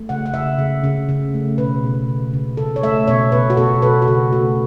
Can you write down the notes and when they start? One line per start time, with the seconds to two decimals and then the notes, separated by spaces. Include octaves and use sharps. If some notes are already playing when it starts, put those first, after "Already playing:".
Already playing: A3
0.09 C#3 F#5
0.26 F#5
0.34 C#3 E5
0.59 C#3
0.84 C#3
1.09 C#3
1.34 A3
1.58 B2 B4
1.83 B2
2.09 C#3
2.34 C#3
2.57 C#3 A4
2.76 C#5
2.83 A3 E5
3.08 B2 C#5
3.32 B2 B4
3.50 F#4
3.57 B2 A4
3.82 B2 B4
4.02 F#4
4.08 C#3 A4
4.32 A3 F#4